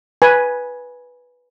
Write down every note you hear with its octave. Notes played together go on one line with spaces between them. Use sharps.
B4 G#5